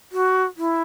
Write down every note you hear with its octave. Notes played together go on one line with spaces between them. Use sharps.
F#4
E4